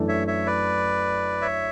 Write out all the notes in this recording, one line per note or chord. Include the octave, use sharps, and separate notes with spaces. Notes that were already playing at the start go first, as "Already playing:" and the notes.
Already playing: F#2 E3 A3 D4 A4
C#5 E5
C#5 E5
B4 D5
C#5 E5